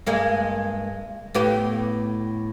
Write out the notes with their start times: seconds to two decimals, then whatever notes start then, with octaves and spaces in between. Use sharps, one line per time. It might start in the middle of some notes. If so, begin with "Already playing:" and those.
0.06 G2 G#3 A#3
1.35 A2 B3 G4